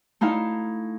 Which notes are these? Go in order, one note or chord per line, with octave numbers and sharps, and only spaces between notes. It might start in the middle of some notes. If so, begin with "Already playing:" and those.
A3 D#4 E4 F5